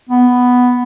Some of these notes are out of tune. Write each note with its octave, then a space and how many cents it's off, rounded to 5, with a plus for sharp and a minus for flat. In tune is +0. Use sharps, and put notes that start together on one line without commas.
B3 +5